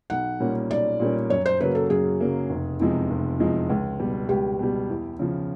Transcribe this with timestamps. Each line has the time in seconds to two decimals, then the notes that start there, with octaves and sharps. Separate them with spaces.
0.10 B1 F#5
0.40 A#2 G3 A#3 C#4
0.70 B1 D5
1.00 A#2 G3 A#3 C#4
1.30 F#2 C#5
1.46 C5
1.60 C#3 F#3 A#3 B4
1.75 A4
1.90 F#2 G#4
2.20 C#3 F#3 A#3
2.49 F1
2.80 E2 C3 F3 G#3
3.10 F1
3.40 E2 C3 F3 G#3
3.69 C#2
4.00 B2 G3
4.29 C#2 G4
4.59 B2 G3
4.89 E2
5.19 C#3 F3